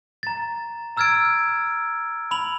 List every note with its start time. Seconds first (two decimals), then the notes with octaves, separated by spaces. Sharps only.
0.23 A#5 A6
0.97 A#5 E6 F6 G#6 A6 D7
2.31 B5 F7 F#7